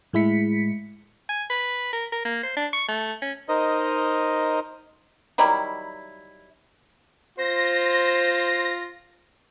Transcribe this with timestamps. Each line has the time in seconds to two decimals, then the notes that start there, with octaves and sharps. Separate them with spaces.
0.13 A2 G#3 E4 B6 C#7
1.29 G#5
1.50 B4
1.93 A#4
2.12 A#4
2.25 A#3
2.43 C5
2.56 D4
2.73 C#6
2.88 A3
3.22 C#4
3.49 D#4 A#4 C5 D#5
5.38 D#3 F#3 G3 E4
7.38 F4 C5 A#6